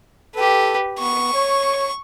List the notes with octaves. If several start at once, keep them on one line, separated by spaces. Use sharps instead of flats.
G4 A4 B4
B3 C#6
C#5